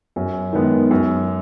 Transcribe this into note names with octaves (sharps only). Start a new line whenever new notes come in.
F#2
D#3 G#3 B3
F#2